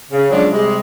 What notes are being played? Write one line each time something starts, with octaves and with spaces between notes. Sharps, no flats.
C#3
F3 F#3 G#3 C#4 D4
C3 G3 G#3